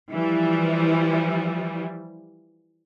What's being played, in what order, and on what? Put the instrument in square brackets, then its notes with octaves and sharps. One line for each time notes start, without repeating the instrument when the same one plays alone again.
[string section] E3 F3 G3